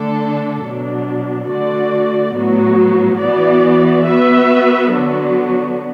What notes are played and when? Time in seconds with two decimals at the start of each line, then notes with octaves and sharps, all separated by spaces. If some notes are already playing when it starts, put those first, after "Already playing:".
Already playing: D3 A3 D4 A4
0.63 B2 F#3 D4
1.48 D3 A3 F#4 D5
2.34 A2 F#3 B3 F#4
3.20 E3 B3 F#4 D5
4.06 B3 F#4 B4 E5
4.92 D3 F#3 B3 D4 F#4